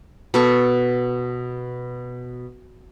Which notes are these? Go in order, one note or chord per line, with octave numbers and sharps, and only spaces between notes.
B2 A4 C#6